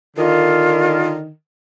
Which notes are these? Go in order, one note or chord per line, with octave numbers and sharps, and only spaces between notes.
D3 D#3 F4